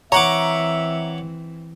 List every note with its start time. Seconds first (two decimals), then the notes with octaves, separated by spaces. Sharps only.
0.12 E3 C4 C#5 E5 F#5 A#5 D6